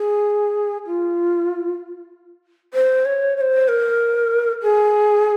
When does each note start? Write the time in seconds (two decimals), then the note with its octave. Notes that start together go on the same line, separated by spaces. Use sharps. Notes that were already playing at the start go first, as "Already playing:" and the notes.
Already playing: G#4
0.87 F4
2.74 C5
3.05 C#5
3.37 C#5
3.41 C5
3.68 A#4
4.63 G#4